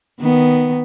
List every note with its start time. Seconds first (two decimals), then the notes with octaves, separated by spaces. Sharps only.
0.20 D#3 B3